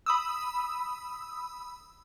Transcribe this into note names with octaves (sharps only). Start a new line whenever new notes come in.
B5 D#6 E6